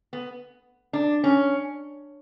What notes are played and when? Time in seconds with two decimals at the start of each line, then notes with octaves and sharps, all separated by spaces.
0.13 B3
0.93 D4
1.24 C#4